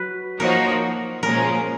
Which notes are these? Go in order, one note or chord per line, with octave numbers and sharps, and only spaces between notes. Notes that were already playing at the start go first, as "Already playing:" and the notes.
Already playing: F#3 B4
F3 A#3 D#4 F#4 A#4 C#5
A#2 F3 G#3 C#4 G#4 A#4